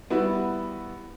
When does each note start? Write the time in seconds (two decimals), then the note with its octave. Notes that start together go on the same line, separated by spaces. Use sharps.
0.10 G3 B3 E4 F#4